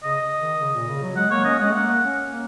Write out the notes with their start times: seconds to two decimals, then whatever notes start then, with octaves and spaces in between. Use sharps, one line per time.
0.03 C#3 D#5
0.40 D#3
0.60 C#3
0.74 A#2
0.88 C#3
1.03 F#3
1.16 G#3 F#5
1.31 A#3 C#5
1.44 C#4 D#5
1.59 G#3 F#5
1.73 A#3 F#5
2.02 C#4
2.30 A#3